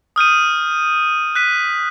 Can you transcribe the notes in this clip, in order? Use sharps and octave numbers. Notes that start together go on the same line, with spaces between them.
D#6 F6 G6 D#7
F#6 B6 D#7